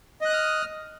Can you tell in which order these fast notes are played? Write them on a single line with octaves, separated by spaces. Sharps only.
D#5 F#6 D#6 F6